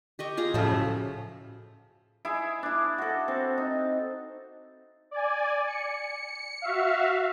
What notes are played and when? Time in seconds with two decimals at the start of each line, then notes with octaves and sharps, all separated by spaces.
0.19 G4 D#5 C#6
0.37 F4 G#4 A#5
0.54 A2 C#3 F3 F#3 A4 E5
2.25 E4 G#4
2.63 D4 E4
2.98 F#4 A4
3.28 C4
3.58 D#4
5.11 D5 G#5
5.67 C#7
6.62 F#4 E5 F5